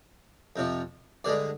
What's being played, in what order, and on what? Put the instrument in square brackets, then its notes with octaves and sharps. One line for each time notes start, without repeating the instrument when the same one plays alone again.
[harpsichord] F2 C3 F3
G2 D3 G#3 D5